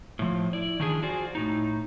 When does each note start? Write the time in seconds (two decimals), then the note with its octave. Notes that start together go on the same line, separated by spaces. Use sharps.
0.19 A2 F3
0.53 E4 D5
0.80 D#3 F3 D4 G#4
1.02 F4 F#4 G#4 C5 D5
1.35 A2 D#4